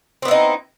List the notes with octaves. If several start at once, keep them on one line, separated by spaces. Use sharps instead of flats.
B3 C4 D#4 E4